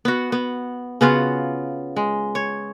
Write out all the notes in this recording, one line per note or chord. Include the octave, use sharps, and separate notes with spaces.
B3 F#4
B3
C#3 B3 F4 F#4
G#3
C#5